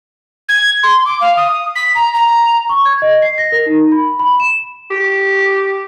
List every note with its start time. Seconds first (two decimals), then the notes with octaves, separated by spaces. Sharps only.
0.49 G#6
0.83 C6
1.05 D6
1.21 F5
1.36 D#6
1.75 B6
1.95 A#5
2.14 A#5
2.69 C#6
2.85 G#6
3.02 D#5
3.22 C7
3.38 A#6
3.52 A#4
3.66 D#4
3.92 B5
4.19 B5
4.40 E7
4.91 G4